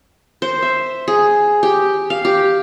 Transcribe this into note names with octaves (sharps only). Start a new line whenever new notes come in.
C5
E5
G#4
G4
F5
G4